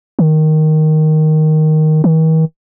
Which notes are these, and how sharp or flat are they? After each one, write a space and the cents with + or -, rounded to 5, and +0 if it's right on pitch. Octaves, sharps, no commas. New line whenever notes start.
D#3 +0
D#3 +45